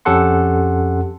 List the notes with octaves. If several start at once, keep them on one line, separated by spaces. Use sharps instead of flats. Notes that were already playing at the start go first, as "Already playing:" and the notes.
F2 C#4 G4 A4 F#5 C6